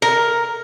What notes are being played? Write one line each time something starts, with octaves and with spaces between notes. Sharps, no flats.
A#4